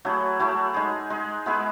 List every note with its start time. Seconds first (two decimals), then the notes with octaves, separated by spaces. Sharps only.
0.05 F#3 A3 E4 G#4
0.39 F#3 A3 E4 G#4
0.74 G#3 D#4 G#4
1.10 G#3 D#4 G#4
1.46 G#3 B3 E4 G#4